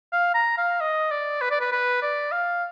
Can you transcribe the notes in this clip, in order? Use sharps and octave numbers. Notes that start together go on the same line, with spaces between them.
F5
A#5
F5
D#5
D5
B4
D5
B4
B4
D5
F5